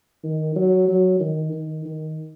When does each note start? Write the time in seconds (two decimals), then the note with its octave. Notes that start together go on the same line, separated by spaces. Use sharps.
0.24 D#3
0.56 F#3
0.88 F#3
1.20 D#3
1.53 D#3
1.85 D#3